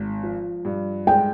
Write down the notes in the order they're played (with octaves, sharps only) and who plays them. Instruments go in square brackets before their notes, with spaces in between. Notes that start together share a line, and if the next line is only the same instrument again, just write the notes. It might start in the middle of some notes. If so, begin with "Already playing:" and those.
Already playing: [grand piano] G#1
F3
G2
[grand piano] G#3 [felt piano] G5